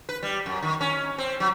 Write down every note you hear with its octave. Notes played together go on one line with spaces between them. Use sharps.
B4
G3
F#2
D#3
C#4
C4
F#3